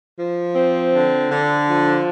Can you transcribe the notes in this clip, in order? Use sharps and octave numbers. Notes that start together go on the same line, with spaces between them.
F3
C4
D3
D3
F3